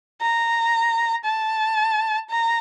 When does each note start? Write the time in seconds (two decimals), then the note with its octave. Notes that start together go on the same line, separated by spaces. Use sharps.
0.21 A#5
1.25 A5
2.30 A#5